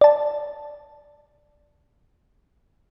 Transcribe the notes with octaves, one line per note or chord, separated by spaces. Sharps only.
D5 A5